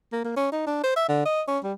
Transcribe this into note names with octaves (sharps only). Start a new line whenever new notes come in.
A#3
A#3
C#4
D#4
D4
C5
E5
D3
D#5
C#4
G3